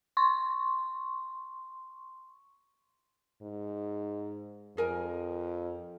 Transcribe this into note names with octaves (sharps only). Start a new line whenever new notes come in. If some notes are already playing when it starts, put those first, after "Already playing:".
C6 C#6
G#2
F2 G#4 A#4 G#5